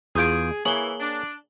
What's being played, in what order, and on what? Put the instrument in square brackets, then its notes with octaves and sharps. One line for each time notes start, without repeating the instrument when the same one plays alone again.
[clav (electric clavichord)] E2 F4 [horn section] G#4 [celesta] D#6 G6 D7
[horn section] E3 [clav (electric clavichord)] A#3 G#4 C#5 [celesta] F#7 G7
[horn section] D4